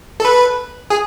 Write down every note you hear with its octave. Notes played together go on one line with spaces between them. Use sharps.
A4
B4
G#4